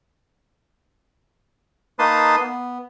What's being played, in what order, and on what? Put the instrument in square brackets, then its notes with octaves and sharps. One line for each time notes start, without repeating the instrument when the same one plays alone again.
[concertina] A#3 D#4 B4 A5 C6 D#6
B3